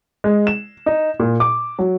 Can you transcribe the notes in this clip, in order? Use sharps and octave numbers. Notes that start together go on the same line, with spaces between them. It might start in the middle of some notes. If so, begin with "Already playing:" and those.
G#3
E7
D#4
A#2
D6
F#3